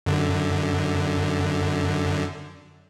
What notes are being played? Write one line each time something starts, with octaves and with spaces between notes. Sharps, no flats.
F#2 D3